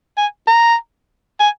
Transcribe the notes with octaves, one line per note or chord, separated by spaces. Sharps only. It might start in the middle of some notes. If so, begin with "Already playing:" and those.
G#5
A#5
G#5